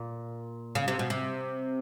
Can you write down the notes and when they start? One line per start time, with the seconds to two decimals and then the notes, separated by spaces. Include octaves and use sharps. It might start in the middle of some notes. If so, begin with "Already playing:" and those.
Already playing: A#2
0.75 C#3
0.88 C3
0.99 B2
1.10 C3